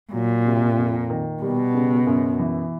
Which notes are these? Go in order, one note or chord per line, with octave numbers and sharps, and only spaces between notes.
A#2 F#3
C3
F2
D#3
B2 G3
C#3
F#2
E3